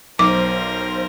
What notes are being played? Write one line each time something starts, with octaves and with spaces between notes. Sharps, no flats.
B1 A#4 C5 D6